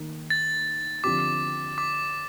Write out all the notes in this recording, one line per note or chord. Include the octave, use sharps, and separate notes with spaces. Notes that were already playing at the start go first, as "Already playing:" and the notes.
Already playing: D#3 A#3 D#4
A6
D3 F3 C4 G4 D6
D6